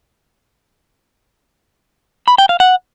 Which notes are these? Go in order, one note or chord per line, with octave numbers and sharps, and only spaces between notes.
B5
G5
F5
F#5